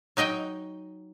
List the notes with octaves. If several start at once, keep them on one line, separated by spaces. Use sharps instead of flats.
F#3 D#4 D#5 G5